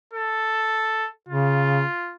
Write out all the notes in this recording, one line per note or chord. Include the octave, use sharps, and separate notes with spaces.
A4
C#3 F4